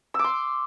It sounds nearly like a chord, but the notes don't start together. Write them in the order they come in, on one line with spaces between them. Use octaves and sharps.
E6 D6 C6